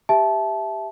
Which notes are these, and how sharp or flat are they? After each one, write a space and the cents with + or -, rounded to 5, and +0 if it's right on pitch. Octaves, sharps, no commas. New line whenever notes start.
G4 +10 E5 +0 A5 -20